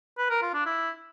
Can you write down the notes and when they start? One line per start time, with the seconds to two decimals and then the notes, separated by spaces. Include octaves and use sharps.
0.18 B4
0.30 A#4
0.42 F4
0.54 D4
0.66 E4